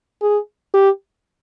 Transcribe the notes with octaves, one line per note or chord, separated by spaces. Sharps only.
G#4
G4